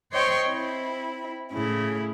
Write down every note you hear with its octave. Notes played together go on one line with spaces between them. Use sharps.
C5 C#5 D#5 G5 C6 C#6
C4 E4
A2 C#3 E4